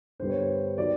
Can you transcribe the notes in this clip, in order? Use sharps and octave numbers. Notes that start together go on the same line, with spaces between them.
G2 D3 G3 B3 C5
C#5
C5
D#3 F#3 B3 D5